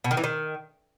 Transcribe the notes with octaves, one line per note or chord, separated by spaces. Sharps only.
B2
D#3
E3
D#3